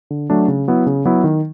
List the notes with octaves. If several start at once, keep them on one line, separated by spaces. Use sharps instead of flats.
D3
F#3 A3 D4
C#3
F#3 B3 E4
C#3
F#3 B3 E4
D#3